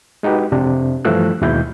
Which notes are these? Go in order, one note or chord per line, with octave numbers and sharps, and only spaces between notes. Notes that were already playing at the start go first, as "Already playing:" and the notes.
G#3 D#4 F#4 G4 B4
F2 C3 D4
G2 E3 F3 A3 E6 F#6
D#2 B2 G#3 E4 G6